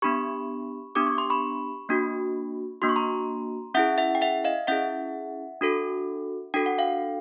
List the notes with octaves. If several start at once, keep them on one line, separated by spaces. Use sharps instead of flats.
B3 D4 G4 B5 C#6
B3 D4 G4 D6
C#6
C6
B5 C#6
A#3 D4 F#4
A#3 D4 F#4 C6
C#6
A#5 C6
C#4 E4 G#4 E5 F#5
E5 F#5
G5
E5 F#5
D#5 F5
C#4 E4 G#4 E5 F#5
D4 F#4 A4
D4 F#4 A4 G5
F#5
F5 G5